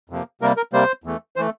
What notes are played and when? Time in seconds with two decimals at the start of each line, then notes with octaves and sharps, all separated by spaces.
0.10 F2 C3 F3 A#3
0.41 C3 G3 A#3 A#4
0.57 A#4
0.73 C3 G3 A#3 C5
1.04 E2 E3 A3
1.36 E3 A3 C5